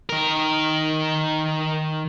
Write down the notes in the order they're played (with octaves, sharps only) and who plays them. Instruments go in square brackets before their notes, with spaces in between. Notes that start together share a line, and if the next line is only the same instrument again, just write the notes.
[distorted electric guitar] D#3 A#4